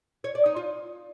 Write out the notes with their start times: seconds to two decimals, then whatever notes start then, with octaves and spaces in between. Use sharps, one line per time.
0.24 C#5
0.35 D5
0.46 D#4
0.56 F4